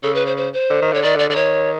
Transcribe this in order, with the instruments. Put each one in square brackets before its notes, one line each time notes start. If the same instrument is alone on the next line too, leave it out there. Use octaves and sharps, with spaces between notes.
[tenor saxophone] C#3 [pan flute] A4
[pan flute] B4
C5
C5
C5
[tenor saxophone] D3
D#3
[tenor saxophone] D3 [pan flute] C#5
[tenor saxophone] D#3 [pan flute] D5
[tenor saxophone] D3 [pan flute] D5
[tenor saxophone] D3 [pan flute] D5
[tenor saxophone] D#3 [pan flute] C#5